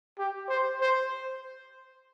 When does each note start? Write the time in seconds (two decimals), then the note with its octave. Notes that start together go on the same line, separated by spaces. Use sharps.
0.19 G4
0.49 C5
0.81 C5